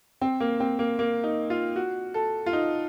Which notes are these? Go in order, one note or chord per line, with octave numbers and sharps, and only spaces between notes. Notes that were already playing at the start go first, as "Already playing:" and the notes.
C4
A#3
C4
A#3
A#3
D#4
F4
F#4
A4
F4
D#4